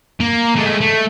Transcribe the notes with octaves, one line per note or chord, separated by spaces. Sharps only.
A#3
G#3 A3
A3